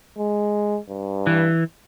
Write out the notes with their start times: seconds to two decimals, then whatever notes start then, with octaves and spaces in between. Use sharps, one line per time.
0.18 G#3
0.89 G2
1.27 E3